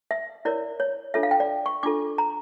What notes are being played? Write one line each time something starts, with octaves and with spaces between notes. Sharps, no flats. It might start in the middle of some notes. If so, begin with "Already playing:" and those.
E5
E4 A#4 C#5 D5
C#5
D4 F4 A4 C#5 E5
F5
G5
D5
C#6
D4 F4 A4 D6
A#5